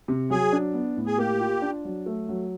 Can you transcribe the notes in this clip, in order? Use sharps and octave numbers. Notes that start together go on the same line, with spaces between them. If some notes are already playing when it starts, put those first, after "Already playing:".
C3
F#3 G#4
D4
B3
A2
G#4
A#3 G4
F4
D4
F#3
A3
F#3